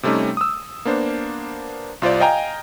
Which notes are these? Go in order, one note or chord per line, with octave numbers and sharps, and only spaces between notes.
C3 G3 A3 C#4 D#4
D#6 E6
A#3 B3 D4 C5
C2 F4 C5 D5
D#5 F5 G5 G#5 A#5